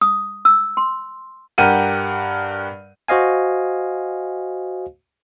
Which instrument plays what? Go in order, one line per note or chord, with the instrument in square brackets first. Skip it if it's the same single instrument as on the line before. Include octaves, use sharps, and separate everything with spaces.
[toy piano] D#6
E6
C6
[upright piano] G2 G4 A#4 F#5 D#7
[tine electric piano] F#4 C5 D#5 F5 G#5